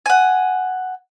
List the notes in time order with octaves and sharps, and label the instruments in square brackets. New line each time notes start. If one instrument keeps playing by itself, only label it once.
[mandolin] F#5 G#5